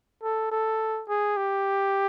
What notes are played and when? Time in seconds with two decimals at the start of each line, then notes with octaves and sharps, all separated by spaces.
0.23 A4
0.51 A4
1.08 G#4
1.37 G4